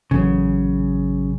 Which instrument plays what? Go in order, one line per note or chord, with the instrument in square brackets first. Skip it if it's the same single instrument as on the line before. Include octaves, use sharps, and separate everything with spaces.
[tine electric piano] A1 F#3 [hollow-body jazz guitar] C#3